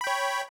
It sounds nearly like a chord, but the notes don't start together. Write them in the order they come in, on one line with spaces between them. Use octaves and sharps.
B5 G5 C#5